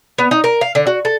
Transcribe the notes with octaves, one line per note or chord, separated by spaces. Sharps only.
B3
D#4
A#4
F5
D3
F#4
A4